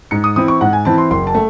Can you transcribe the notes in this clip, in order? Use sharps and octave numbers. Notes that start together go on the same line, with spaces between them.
G#2 C#7
D#6
E3 C4 E4 D#6
C#6
G#2 F#5
G#5
E3 C4 E4 A5
C6
F#1 C6
A5
A3